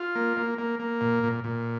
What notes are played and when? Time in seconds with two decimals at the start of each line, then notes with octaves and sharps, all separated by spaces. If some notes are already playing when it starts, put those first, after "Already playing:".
Already playing: F4
0.15 A#3
0.37 A#3
0.59 A#3
0.79 A#3
1.01 A#2
1.23 A#2
1.44 A#2